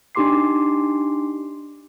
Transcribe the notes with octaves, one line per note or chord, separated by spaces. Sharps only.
D4 D#4 G4 C6 D6 C7